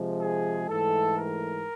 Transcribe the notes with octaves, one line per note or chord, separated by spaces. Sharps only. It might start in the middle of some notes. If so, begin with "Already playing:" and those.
Already playing: C3 F3 G#3
G#4
G#2 E3 A3 A4
A#4